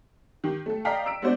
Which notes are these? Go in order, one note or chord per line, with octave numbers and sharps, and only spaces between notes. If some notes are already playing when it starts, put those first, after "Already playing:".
D#3 G4
A3 A4
D5 D#5 F5 G5 A#5 B6
E6 D7
G#3 B3 D4 F#4 C5 D5